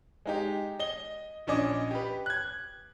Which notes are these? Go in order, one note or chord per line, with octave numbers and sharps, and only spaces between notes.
G#3 D#4 G4
D#5 G7
A#1 C#4 D4 D#5 D6
G4 B4
F#6 G#6